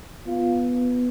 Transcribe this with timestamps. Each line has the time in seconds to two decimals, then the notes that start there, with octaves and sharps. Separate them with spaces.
0.26 B3 F4